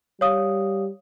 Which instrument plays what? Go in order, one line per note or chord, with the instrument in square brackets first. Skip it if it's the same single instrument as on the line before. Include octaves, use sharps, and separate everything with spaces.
[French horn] G3 [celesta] C#5 F5 D#6